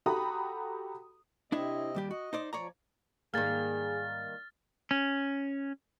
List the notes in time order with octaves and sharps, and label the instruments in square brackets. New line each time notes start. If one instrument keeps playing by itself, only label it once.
[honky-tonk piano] F#4 G4 A4 A#5 B5 D#6
[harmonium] C3 C4 D#5 [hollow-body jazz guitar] D4 E4 C#5
[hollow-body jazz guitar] D#2 G3 G4
[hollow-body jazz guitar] F#4 [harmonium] D#5
[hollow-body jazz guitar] D#4 C5 D5
[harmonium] F3 [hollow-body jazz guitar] C#5 D5 A#5
[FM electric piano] G#2 [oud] D#3 G3 A#3 [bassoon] G#4 [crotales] F6 A6
[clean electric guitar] C#4